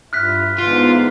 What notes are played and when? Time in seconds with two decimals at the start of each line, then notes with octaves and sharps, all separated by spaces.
0.13 G2 E4 F4 F6 F#6 B6
0.58 G#2 D3 E3 B3 E4 F4